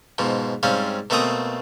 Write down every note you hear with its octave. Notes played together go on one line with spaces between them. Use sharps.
G#2 B2 F3
G#2 G3 C4 C#4 F5
B2 A3 A#3 C4 A#5 D#6